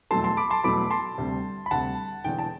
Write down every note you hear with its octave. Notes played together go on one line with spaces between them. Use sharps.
E2 B2 F#3 A3 A5 C6
A5 C6
B5 D6
A5 C6
E2 B2 F#3 A3 B5 D6
A5 C6
D2 C3 G3
B5
D2 C3 G3 F#5 A5
E1 E2 D3 G5
A5